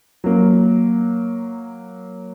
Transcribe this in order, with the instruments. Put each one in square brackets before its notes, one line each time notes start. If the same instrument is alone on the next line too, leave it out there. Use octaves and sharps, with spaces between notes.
[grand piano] F#3 A#3